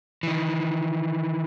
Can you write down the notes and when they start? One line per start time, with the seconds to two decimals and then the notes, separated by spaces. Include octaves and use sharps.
0.23 D#3 E3